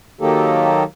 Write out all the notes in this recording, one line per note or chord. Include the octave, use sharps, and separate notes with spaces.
D#3 F#3 A#3 D#4 G4 A4